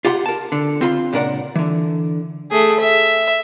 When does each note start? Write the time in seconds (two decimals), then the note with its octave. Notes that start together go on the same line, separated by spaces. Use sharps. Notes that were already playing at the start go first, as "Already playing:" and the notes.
0.05 F4 G4 F#5 A5 C6
0.26 A#4 A5
0.52 D3
0.81 C4 F4 B5 C6
1.13 C#2 A#2 D4 A#4 D5 F#5
1.55 D3 E3
2.51 A3 G#4
2.80 E5